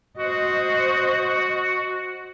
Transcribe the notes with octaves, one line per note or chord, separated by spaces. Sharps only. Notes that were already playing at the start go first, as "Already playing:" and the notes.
F#4 C5 D#5